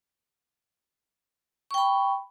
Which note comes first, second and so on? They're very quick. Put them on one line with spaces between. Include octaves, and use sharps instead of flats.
C#6 G5 B5